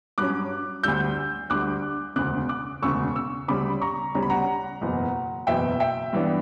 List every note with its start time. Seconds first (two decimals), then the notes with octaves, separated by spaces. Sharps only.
0.18 G2 F#3 C#4 D6 F#6
0.83 D2 D3 G3 E6 G6
1.50 D2 D3 G3 D6 F#6
2.16 E1 D2 C#3 D6 F#6
2.49 D6 F#6
2.82 E1 D2 C#3 C#6 E6
3.16 C#6 E6
3.48 D2 C#3 G3 C#4 B5 D6
3.81 A#5 C#6
4.15 D2 C#3 G3 C#4 A#5
4.23 B5
4.30 F#5 A#5
4.81 F#1 E2 B2
5.47 F#1 E2 B2 E5 G5
5.80 E5 G5
6.13 G2 E3 B3 D4